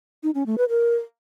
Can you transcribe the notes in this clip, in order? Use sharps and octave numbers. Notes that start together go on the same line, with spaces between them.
D#4
C#4
A3
B4
A#4